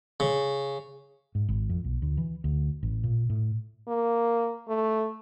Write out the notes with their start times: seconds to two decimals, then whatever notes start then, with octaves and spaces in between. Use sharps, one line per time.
0.20 C#3
1.35 G#2
1.49 G#1
1.69 F2
1.84 B1
2.02 D2
2.17 E3
2.44 D2
2.83 A1
3.04 A#2
3.30 A2
3.88 A#3
4.68 A3